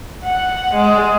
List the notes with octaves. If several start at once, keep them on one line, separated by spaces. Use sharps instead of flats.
F#5
G#3